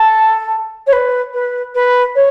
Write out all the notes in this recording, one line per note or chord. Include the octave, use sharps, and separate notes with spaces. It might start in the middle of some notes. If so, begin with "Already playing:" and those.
Already playing: A4
C#5
B4
B4
B4
C#5